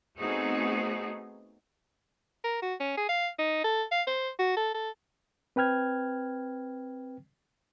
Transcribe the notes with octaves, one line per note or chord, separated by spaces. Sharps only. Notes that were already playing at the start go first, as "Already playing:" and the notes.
A3 B3 C4 D#4 F#4 G#4
A#4
F#4
C#4
G#4
F5
D#4
A4
F5
C5
F#4
A4
A4
C4 B4 G5 F6 G#6